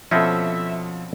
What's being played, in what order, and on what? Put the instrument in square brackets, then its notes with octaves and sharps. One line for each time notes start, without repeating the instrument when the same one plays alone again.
[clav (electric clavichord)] B2 C4 C#4 [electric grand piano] F3 A4 [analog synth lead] E5